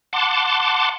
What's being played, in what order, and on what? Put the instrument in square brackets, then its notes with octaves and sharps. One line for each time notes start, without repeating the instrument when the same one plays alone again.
[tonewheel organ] F#5 A5 C6 D6